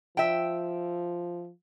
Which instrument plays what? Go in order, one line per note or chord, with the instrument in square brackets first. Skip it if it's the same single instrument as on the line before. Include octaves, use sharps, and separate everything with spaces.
[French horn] F3 [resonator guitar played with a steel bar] E5 G5